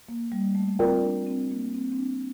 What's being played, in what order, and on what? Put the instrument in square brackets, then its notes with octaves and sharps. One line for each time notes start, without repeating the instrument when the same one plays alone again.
[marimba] A#3
G3
A3
[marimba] C4 [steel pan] F4 A#4 D5 G5
[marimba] D4
C4
A#3
C4
C4
D4